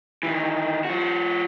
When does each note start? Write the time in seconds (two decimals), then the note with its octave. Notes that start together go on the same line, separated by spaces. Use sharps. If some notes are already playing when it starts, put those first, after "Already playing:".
0.23 D#3 E3
0.85 F3 F#4